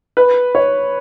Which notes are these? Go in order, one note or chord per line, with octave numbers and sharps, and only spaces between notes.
B4
C#5